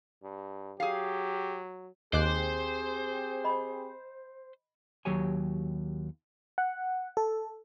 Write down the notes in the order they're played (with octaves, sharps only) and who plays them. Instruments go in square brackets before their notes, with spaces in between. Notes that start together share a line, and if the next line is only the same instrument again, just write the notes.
[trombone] G2
[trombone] F#3 [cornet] G4 [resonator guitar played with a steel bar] G#4 F5
[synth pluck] D#2 D6 F#6 [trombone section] C4 G4 G#4 [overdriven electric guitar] C5 [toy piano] D#5
[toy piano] D#5 B5
[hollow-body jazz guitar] D#2 F#3 G4 C#5 G#5
[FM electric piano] F#5
A4